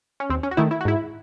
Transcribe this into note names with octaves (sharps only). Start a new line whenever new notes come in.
C#4
D#2 C4
C#4
F#4
D#3 A3 E4
E4
F#4
G#2 E4